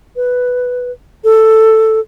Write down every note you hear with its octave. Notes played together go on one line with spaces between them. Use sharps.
B4
A4